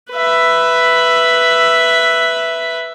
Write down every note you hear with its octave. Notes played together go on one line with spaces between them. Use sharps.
B4 E5